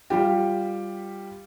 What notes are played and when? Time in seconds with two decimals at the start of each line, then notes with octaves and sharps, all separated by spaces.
0.10 G3 F4 G4